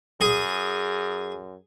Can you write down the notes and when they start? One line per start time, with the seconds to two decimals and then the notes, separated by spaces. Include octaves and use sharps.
0.21 F#2 G#4